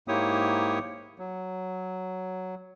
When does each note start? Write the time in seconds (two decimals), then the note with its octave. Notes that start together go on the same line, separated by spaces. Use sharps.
0.08 G#2 A#3 E4 G4 C#5 D#6
1.19 F#3